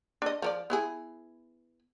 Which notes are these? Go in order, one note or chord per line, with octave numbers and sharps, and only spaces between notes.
D4 D#5
F3 A#4 D5
B3 E4 G#4